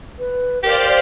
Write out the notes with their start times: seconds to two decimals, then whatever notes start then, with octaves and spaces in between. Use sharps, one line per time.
0.19 B4
0.63 G4 A#4 C5 D5 F5